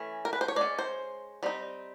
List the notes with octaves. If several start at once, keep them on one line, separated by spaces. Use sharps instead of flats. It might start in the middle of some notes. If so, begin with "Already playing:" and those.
Already playing: E3 A3 C#4
A#4
B4
C5
C#5
G#3 C#4 D5
C5
G3 C4 D#4